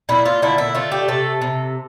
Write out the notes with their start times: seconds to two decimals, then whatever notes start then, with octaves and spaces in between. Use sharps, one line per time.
0.09 A#2 E4
0.25 F4
0.42 D3 E4
0.58 E4
0.75 A3 F4
0.92 G4
1.08 C3 A4
1.42 C3